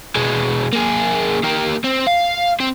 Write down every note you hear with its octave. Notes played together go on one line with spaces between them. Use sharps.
B2 G#3
A#3 G#4
A#3 G4
C4
F5
C4